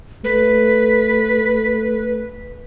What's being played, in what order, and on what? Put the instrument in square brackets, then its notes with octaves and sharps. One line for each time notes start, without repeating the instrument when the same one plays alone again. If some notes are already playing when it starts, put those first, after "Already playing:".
[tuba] A3 [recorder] B4